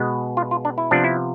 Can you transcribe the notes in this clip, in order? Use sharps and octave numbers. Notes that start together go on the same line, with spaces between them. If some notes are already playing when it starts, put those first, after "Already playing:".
Already playing: B2 G#3 B3
F4
F4
D4
E4
C3 F3 B3 D4
E4